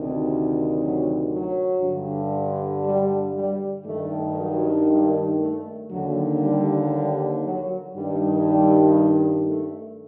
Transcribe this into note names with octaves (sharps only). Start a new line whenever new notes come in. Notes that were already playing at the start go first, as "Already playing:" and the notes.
Already playing: D2 C3 D#3
F#3
F#3
G2 D3
G3
G3
G2 D#3 A3
F#3
G3
A3
D#2 D3 F#3
G3
G3
F#3
G2 D#3 G3
G3
A3